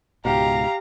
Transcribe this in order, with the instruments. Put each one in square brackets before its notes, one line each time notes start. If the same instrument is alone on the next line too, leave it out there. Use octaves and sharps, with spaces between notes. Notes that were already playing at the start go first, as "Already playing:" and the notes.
[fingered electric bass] C#2 G#2 B2 [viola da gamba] G4 [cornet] F5 [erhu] A#5